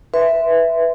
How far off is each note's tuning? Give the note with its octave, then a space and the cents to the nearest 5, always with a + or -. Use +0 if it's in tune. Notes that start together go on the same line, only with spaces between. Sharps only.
B4 +0 E5 +0 C6 -15